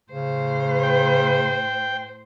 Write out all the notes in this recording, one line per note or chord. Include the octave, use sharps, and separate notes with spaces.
A2 C#3 C5
G5